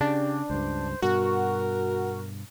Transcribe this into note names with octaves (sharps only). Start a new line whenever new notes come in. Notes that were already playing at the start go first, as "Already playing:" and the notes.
C#3 D4 G4
C#2 G2 C5
G2 B2 F#4 A#4